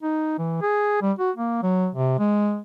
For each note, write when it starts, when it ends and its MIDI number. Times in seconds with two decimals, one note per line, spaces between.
0.02 0.37 63
0.38 0.58 52
0.61 0.99 68
1.02 1.12 55
1.19 1.31 66
1.36 1.59 58
1.63 1.88 54
1.94 2.15 48
2.19 2.60 56